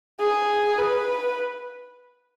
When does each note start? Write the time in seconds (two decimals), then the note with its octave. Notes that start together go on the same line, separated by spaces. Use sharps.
0.20 G#4
0.77 B4